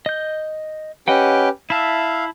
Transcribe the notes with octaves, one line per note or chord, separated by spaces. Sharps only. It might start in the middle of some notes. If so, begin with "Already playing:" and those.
D#5 G6
C#4 G4 B4 D#5 F#5 G5
E4 E5 F5 A5